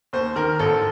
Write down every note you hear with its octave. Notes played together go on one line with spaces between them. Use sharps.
D#2 C5
D#3 A#4
A1 A4